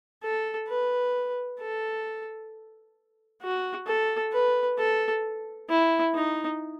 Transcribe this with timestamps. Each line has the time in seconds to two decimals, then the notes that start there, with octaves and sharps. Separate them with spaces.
0.24 A4
0.69 B4
1.60 A4
3.43 F#4
3.87 A4
4.33 B4
4.78 A4
5.70 E4
6.15 D#4